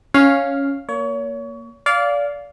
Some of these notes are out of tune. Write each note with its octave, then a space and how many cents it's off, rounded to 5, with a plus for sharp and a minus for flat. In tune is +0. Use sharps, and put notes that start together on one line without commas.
C#4 +0 F5 +0
A#3 +0 C#5 +30
D5 -25 F5 +0